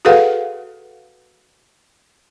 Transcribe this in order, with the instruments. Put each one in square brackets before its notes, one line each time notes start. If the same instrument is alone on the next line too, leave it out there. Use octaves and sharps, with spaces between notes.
[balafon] F#4 G#4 A4 B4 F5 F#5